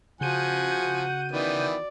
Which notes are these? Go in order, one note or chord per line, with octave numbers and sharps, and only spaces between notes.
C#3 F3 F#4 F#5 G#5 G6 D#7
D#3 E3 B3 D5